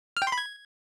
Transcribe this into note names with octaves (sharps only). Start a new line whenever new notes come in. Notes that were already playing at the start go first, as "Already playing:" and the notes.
F6
G5
C6
B5
G#6